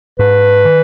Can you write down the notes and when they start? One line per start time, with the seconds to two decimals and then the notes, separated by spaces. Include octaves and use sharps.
0.19 G#2 B4
0.65 D#3